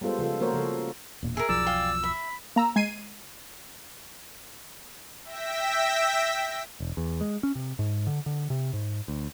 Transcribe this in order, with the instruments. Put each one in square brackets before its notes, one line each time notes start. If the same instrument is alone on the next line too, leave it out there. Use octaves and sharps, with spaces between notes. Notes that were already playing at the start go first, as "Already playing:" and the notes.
[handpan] G3 G#3 B3 F4 A4 C5
C#3 F3 F4 A4
F3 A#3 F#4 A#4 C5 C#5
C#3 F3 A4
[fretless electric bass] E1 A#2
[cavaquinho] G#4 A#4 [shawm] E5
[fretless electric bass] E1 B1 F3 [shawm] D5 [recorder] E6
[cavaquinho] F5 G5 G#5
[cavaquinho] E5 [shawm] B5
[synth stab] A#3 A#5 E6
G#3 G#6 C7 D#7
[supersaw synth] E5 G5 E6 A#6 B6
[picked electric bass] E1
E2
G#3
C#4
C3
G#2
D3
D3
C3
G#2
D2